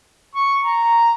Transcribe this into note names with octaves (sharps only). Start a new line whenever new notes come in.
C#6
A#5